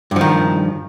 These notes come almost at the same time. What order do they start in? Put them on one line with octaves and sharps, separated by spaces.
G2 F3 D#3